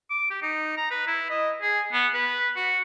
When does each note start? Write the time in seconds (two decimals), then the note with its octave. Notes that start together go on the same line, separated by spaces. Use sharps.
0.10 D6
0.30 G4
0.42 D#4
0.77 A#5
0.91 B4
1.07 E4
1.30 D#5
1.62 G#4
1.93 B3
2.14 B4
2.57 F#4